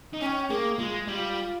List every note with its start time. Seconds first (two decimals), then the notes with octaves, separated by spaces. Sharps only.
0.13 D#4
0.21 C#4 G#5
0.26 G5
0.49 A#3 G#4
0.78 G#3 F4
1.07 G3 F4